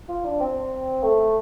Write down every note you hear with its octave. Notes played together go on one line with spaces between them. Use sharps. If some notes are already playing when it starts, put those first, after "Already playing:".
F4
D4
C4
A3